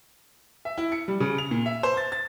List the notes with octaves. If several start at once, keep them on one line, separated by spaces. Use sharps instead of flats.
E5
E4
C#7
G3
C#3
F7
A#2
E5
C5
A6
A6